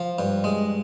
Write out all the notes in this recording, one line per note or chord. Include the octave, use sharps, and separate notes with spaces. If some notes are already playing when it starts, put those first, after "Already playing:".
Already playing: F3
G2
G#3